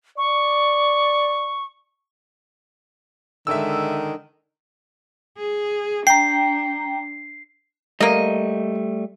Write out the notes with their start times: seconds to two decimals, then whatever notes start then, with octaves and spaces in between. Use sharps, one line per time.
0.18 D5 C#6
3.47 D3 D#3 G#3 E5 E6
5.38 G#4
6.07 D4 G5 A#5 C7
8.00 G3 A3 A#3 D#5